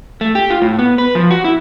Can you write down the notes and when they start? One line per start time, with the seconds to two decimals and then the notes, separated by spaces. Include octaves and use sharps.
0.21 A3
0.35 G4
0.50 F4
0.62 A2
0.79 B3
0.98 B4
1.15 F3
1.31 F#4
1.44 E4